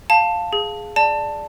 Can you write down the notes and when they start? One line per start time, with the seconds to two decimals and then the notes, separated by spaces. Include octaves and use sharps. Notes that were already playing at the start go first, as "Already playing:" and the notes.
0.10 F5 A5
0.53 G#4
0.96 D5 A5